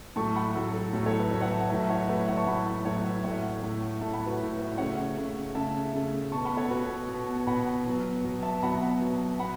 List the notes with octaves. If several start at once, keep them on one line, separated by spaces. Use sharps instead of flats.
A2 F#3 A3 A5 C#6
F#5 B5
A2 F#3 A3 A4
A4
A2 F#3 A3 A4
A4 C#5
B4 E5
A2 F#3 A3 B4 E5
C#5 F#5
E5 A5
A2 F#3 A3 E5 A5
C#5 F#5
A2 F#3 A3 B4 E5
C#5 F#5
A5 C#6
A2 F#3 A3 F#5 B5
E5 A5
A2 F#3 A3 C#5 F#5
B4 E5
A2 A3 C#5 F#5
A2 A3
A2 A3 E5 A5
F#5 B5
F#4 B4
A2 A3
B4 E5
C#3 A3 C#5 F#5
C#3 A3
C#3 A3 E5 A5
C#3 A3
B2 B3 A5 C#6
F#5 B5
A4 C#5
B2 B3 F#4 B4
B2 B3
B2 B3 F#5 B5
B2 F#3 B3
B2 F#3 B3
E5 A5
B2 F#3 B3 F#5 B5
B2 F#3 B3
B2 F#5 B5